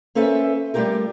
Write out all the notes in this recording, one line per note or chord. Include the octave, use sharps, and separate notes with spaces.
A#3 C#4 A4 B4 C5 E5
G3 A3 C#4 F4 G4 A#4